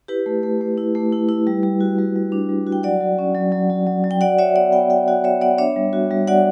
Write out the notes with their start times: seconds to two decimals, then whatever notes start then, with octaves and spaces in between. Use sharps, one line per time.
0.08 E4 G4 B4
0.26 A3
0.43 A3
0.61 A3
0.78 E4
0.95 A3
1.13 E4
1.29 E4
1.47 G3
1.63 G3
1.81 F#4
1.98 G3
2.16 G3
2.32 D4
2.49 G3
2.67 F#4
2.72 G5
2.83 F#3 D5 F#5
3.00 F#3
3.19 C#4
3.35 F#3
3.52 F#3
3.70 F#3
3.86 F#3
4.04 F#3
4.11 G5
4.21 F#4 D5 F#5
4.38 F#4 C#5 E5
4.56 B3 D5 F#5
4.72 B3 E5 G5
4.90 B3 E5 G5
5.08 F#4 D5 F#5
5.24 B3 C#5 E5
5.41 B3 D5 F#5
5.58 D4 C#5 E5
5.76 G3
5.93 F#4
6.11 G3
6.28 F#4 D5 F#5